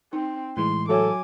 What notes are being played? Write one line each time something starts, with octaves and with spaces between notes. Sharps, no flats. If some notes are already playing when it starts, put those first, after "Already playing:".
C4 D#4
A2 E3 G#3 C6
F#3 F#4 A4 C#5 G#5 D6